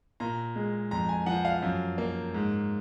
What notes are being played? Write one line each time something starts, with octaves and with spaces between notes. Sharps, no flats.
A#2 A#5
G#3
F2 A#5
G#5
F3 F#5
F5
F#2
A#3
G#2